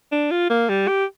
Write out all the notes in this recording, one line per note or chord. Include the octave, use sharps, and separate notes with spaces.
D4
F4
A#3
G3
G4